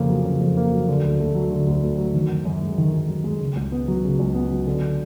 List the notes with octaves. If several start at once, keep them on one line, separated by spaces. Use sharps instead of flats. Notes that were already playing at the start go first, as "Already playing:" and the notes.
Already playing: F2 C#3 A#3
F#3
C#3
F2
A#3
F#3
D3
D2
A3
F#3
D3
D2
A3
F#3
D#3
F#2
F#2
G#3
D#3
F#2
F#2
G#3
C#3
C#2
B3
F#3
C#3
C#2
B3
F#3
D3